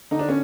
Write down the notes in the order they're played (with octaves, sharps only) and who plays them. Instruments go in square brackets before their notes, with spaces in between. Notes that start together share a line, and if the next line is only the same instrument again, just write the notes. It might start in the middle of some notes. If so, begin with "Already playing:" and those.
[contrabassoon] D3 [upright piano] D#4
[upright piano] D4
C#4